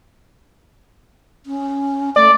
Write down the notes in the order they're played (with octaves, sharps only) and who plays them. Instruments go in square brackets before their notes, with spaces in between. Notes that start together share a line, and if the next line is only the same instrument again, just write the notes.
[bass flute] C#4
[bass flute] A3 [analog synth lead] D5